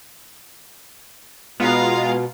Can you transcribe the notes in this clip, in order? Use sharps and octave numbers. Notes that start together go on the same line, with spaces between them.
B2 G#3 B3 F4 F5 A#5